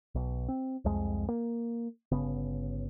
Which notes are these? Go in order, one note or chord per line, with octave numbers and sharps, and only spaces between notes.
B1
C4
C2 F2 G#3
A#3
G1 C#3 B3